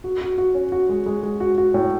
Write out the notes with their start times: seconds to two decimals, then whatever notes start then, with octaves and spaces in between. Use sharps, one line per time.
0.04 F#4
0.21 F#4
0.38 F#4
0.55 C#4
0.72 F#4
0.89 G#3
1.06 G#3
1.23 G#3
1.40 F#4
1.58 F#4
1.74 A2